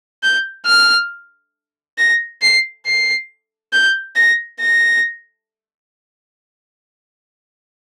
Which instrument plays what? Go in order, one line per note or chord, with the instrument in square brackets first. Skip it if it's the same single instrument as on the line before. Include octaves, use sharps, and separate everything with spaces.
[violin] G6
F6
A#6
C7
C7
G6
A#6
A#6